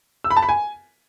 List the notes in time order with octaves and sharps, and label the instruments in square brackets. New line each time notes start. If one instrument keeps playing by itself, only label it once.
[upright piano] E6
B5
A5
B5
G#5